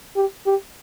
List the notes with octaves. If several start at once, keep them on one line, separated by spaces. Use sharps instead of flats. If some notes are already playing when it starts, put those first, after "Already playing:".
G4
G4